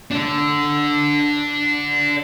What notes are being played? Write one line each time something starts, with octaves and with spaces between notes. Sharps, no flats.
D4 A4